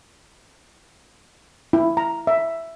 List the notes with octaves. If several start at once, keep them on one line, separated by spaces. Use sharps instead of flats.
E4
A#5
E5